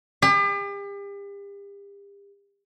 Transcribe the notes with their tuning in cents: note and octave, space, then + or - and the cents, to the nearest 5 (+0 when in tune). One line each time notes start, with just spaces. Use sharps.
G4 +40